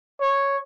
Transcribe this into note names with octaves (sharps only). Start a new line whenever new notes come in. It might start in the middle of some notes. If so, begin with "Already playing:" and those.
C#5